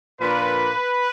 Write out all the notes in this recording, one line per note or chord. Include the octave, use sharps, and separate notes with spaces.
A#2 F3 A#3 D4 B4